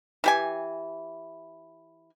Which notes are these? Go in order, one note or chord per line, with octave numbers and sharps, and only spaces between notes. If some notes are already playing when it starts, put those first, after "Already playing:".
E3 G4 G#5